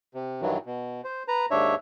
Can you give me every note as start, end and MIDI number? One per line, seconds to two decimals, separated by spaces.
0.14 0.41 48
0.41 0.58 43
0.41 0.58 51
0.41 0.58 52
0.41 0.58 54
0.66 1.01 47
1.04 1.23 72
1.28 1.46 71
1.28 1.46 82
1.51 1.75 39
1.51 1.75 44
1.51 1.75 62
1.51 1.75 73
1.51 1.75 76